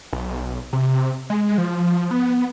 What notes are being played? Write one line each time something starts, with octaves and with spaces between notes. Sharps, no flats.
B1
C3
G#3
F3
B3